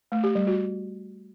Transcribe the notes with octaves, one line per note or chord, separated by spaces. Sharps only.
A3
G4
G3
F#4